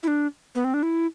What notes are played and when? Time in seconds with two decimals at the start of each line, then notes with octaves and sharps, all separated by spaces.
0.03 E4
0.08 D4
0.55 B3
0.64 C4
0.74 D4
0.83 E4